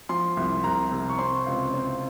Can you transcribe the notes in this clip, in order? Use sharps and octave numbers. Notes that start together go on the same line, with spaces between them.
F3 C6
C2
C2 A#5
C3
C#6
C4 C6
C#2
C4